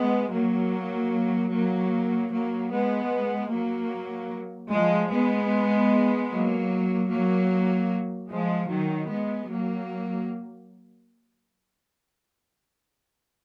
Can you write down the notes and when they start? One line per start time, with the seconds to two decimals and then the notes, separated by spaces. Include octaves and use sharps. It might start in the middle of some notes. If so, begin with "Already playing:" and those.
Already playing: G#3 B3
0.33 F#3 A#3
1.53 F#3 A#3
2.32 F#3 A#3
2.72 G#3 B3
3.52 F#3 A#3
4.72 F3 G#3
5.12 G#3 B3
6.31 F#3 A#3
7.11 F#3 A#3
8.30 F3 G#3
8.70 D#3 F#3
9.10 G#3 B3
9.50 F#3 A#3